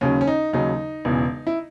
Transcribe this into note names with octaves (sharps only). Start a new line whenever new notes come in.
D#2 C#3 F#3 C#4
C#4
D#4
D#2 C#3 F#3 D#4
E1 E2 C#3 E3
E4